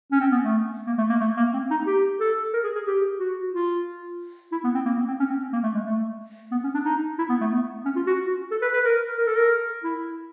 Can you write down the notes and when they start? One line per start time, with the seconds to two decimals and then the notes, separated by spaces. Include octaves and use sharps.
0.12 C#4
0.21 C4
0.32 B3
0.43 A3
0.87 A#3
0.98 A3
1.10 A#3
1.20 A3
1.37 A#3
1.54 C4
1.71 D#4
1.87 G4
2.20 A4
2.53 A#4
2.64 G#4
2.75 G#4
2.87 G4
3.19 F#4
3.53 F4
4.52 E4
4.64 B3
4.75 C4
4.86 A#3
4.97 B3
5.08 C4
5.19 C#4
5.30 C4
5.53 A#3
5.63 A3
5.75 G#3
5.85 A3
6.52 B3
6.64 C#4
6.75 D4
6.85 D#4
7.18 E4
7.29 B3
7.41 A3
7.52 B3
7.85 C#4
7.96 F4
8.07 F#4
8.51 A4
8.62 B4
8.74 B4
8.85 A#4
9.18 A#4
9.27 A4
9.35 A#4
9.84 E4